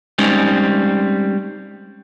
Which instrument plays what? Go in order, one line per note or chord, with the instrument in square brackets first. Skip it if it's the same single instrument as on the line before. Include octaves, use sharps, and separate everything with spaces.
[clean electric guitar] G3 G#3 C4 C#4 D#4